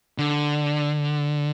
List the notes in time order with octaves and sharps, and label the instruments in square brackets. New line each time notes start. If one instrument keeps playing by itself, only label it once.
[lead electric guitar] D3